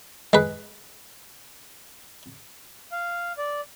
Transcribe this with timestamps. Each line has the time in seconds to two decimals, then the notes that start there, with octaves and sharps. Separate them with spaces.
0.33 G#3 B4
2.92 F5
3.38 D5